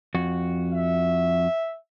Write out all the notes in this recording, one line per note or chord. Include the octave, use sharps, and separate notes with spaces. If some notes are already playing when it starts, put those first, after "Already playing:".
F2 F#4
E5